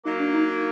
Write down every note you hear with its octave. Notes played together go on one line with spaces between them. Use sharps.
F#3 A#3 D#4
D4
D#4